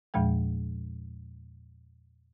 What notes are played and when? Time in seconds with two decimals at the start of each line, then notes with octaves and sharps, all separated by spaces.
0.14 E2 A#2 F3 G#3 G5